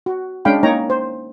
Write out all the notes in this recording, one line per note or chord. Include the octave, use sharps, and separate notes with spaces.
F#4
G#3 C#4 D4 F5 G5 B5
A#3 D#4 C#5 G5 A#5
C5